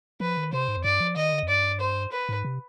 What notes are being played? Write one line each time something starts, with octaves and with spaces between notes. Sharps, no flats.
F3 B4
D#3
C3 C5
G#2
F2
G2 D5
F3
D#3 D#5
D3
F2
G2 D5
C5
B4
G#2
C3